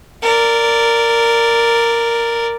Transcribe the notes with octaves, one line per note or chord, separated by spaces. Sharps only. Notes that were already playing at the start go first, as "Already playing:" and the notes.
A#4 D5